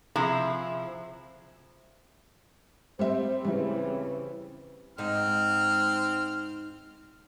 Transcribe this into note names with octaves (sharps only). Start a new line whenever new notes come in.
C3 F3 E4 G#4
G3 C4 C5 E5
C#3 E3 G3 C4 E4
G#2 C4 D#4 F6